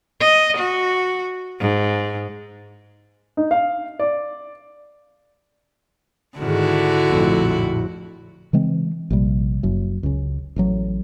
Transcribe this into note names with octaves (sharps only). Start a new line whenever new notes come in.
D#5
F#4
G#2
D#4
F5
D5
G#2 D3 D#3 G#3 E4 F#4
A#1 F2 A2
C#3 E3 G#3 C4
A#1 C3 G3
F#1 F#2
C#2 C#3
A1 A2 F#3